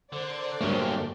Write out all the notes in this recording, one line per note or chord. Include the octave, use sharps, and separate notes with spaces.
D3 A#4 C5 D5
G2 D3 F#3 A3 A#3 C#4 G4